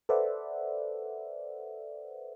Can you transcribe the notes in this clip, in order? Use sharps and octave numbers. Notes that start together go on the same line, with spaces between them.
A4 B4 C5 D5 E5 F#5